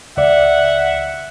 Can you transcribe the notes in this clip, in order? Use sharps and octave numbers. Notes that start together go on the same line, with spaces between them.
C#2 D5 E5 F#5